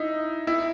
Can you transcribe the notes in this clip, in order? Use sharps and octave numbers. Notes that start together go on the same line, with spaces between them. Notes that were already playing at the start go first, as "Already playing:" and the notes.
Already playing: D#4 E4
E4